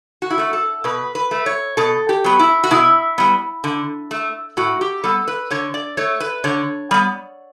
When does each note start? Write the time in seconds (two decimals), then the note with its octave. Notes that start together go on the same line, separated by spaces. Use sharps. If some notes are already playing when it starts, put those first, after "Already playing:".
0.22 F#4
0.30 E4
0.38 A3 F#4
0.53 A4
0.84 B2 B4
1.15 B4
1.31 A3
1.46 C#5
1.77 B2 A4
2.09 G4
2.24 F#3 B3
2.39 E4
2.63 F#4
2.71 B2 E4
3.18 G3 B3
3.64 D3
4.11 A3
4.57 A2 F#4
4.81 G4
5.04 G3 B3 A4
5.28 B4
5.50 D3 C#5
5.74 D5
5.97 A3 C#5
6.20 B4
6.44 D3 C#5
6.91 G3 B3